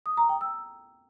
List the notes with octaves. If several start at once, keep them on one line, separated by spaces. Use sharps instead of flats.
D#6
A#5
G5
E6